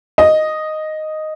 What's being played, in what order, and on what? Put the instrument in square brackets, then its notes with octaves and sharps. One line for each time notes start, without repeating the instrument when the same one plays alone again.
[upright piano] D#5